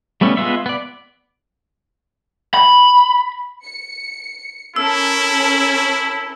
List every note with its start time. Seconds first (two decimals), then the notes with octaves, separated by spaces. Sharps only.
0.21 G3 A3 B3 C#4
0.37 G#3 B3 F4 E5
0.66 B3 D5
2.54 B5
3.65 C#7
4.76 C#4 E4 A4 A#4 E6